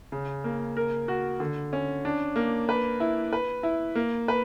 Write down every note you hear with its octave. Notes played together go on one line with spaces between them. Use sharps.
C#3
A#3
A#4
F#4
D3
C#4
D4
A#3
B4
E4
B4
E4
A#3
B4